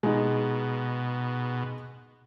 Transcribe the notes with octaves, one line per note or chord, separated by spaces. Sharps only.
B2 G#3 D#4